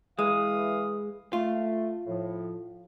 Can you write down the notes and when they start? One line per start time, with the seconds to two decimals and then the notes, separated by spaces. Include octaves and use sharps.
0.19 E3 G#3 F5 D#6
1.33 A3 F4
2.07 A2 F3